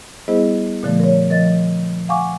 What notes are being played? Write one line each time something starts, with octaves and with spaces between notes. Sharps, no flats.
G3 B3 E4 G#4 C5 D#5
A#2 D3 F3 A3
A#4 C#5
F3 A#4 D#5 A6
F5 F#5 G#5 C#6 D6